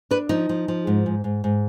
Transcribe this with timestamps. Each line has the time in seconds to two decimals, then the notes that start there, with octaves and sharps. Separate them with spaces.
0.11 D4 B4
0.29 F3 D#4
0.49 F3
0.68 F3
0.87 G#2
1.06 G#2
1.24 G#2
1.44 G#2